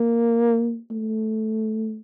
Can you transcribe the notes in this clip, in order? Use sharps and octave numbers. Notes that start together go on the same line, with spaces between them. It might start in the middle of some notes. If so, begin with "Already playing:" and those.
Already playing: A#3
A3